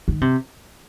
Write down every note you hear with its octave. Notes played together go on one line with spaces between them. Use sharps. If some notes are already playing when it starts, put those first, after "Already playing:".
D#3
C3